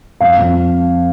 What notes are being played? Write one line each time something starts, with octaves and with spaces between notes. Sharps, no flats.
F2 F5
F2